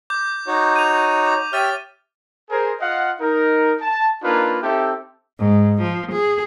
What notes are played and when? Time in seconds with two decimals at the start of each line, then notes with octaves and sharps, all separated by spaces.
0.10 D6 G6
0.47 D#4 F#4 C#5
0.76 D#7 F7
1.26 D6
1.53 G4 C#5 E5 F6 A6 D#7
2.50 G#4 A#4 C5
2.80 F4 D#5 F5 F#5
3.20 D#4 A#4
3.81 A5
4.23 A#3 D4 D#4 F4 A#4 B4
4.62 C4 D#4 G4 A4 E5
5.39 G#2
5.81 F3
6.12 G#4